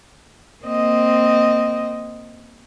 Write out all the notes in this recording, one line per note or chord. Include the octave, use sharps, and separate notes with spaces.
A#3 C4 D#5